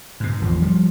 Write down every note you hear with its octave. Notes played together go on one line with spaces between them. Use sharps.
G#2 B2
G#1 E2 F3
F3 G3